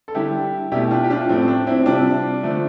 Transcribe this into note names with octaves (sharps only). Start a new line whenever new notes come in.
A4
D3 G3 E4 G4
B2 A3 E4 G4
D4 F4
G4
D4 F4
A2 F3 A3 C4
C4
D4
C4 E4
C3 G3 D4 F4
D3 F3 A3